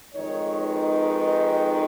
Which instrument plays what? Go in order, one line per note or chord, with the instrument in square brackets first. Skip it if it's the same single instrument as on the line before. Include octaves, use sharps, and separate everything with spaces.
[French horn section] F2 D#3 G#3 D#4 C#5
B4